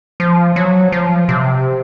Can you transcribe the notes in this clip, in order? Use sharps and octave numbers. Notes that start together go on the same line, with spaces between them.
F3
F#3
F3
C3